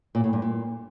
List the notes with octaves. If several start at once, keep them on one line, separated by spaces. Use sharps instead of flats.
A#2
A2
G2
A#2